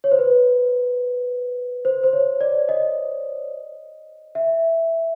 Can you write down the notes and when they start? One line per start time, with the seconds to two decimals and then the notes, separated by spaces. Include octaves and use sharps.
0.04 C#5
0.12 C5
0.19 B4
1.85 C5
2.03 C5
2.13 C#5
2.41 D5
2.69 D#5
4.35 E5